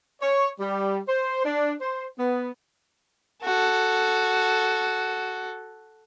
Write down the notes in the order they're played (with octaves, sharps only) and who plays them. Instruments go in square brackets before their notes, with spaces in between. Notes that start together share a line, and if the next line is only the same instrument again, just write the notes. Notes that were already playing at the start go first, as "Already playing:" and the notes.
[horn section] C#5
G3
C5
D4
C5
B3
[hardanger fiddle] F#4 A4